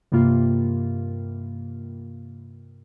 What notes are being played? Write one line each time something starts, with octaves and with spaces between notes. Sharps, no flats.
G2 C3 G3 A#3 F4